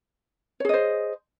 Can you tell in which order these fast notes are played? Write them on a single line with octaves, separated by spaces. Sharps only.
C#5 G#4 D#5 C5